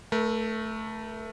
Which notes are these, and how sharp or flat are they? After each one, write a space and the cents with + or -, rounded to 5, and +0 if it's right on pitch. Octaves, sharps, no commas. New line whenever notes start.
A3 +0 A#4 +40